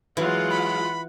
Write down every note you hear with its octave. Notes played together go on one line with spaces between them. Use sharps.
E3 F#3 G#3 F4 F#5
B5